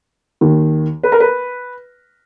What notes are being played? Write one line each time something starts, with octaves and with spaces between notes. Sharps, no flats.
D#2 D#3
B4
A#4
B4